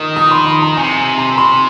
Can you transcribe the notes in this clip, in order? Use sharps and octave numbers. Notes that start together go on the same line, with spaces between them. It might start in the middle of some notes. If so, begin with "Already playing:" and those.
Already playing: D#3 D#6
D#6
C6
C6
A#5
C3 G#5
G#5
A#5
C6